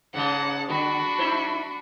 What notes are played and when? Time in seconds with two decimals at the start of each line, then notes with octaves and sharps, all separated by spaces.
0.14 G#2 C#3 G#3 F#5 A5
0.70 D3 D4 F#4 B5
1.19 D#4 E4 C5